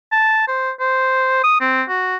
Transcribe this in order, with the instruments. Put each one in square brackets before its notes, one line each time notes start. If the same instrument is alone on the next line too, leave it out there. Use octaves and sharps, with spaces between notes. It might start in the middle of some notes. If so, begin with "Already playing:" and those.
[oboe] A5
C5
C5
D#6
C4
F#4